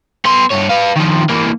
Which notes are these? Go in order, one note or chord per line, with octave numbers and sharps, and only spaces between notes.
B3 C6
G2 C#5
B4 F5
D#3 F3
E3 A#3